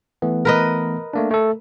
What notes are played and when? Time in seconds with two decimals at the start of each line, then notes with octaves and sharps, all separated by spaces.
0.22 E3 A3 B3
0.45 A#4 B4 D#5
1.13 A3 A#3 D4
1.31 A3 A4